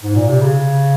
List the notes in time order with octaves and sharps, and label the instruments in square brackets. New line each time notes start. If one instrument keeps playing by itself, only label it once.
[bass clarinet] G#2
A#2
C3
C#3